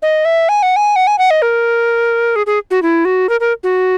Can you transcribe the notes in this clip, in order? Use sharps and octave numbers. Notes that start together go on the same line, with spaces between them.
D#5
E5
G#5
F#5
G#5
F#5
G#5
F#5
D#5
A#4
G#4
G#4
F#4
E4
F#4
A#4
A#4
F#4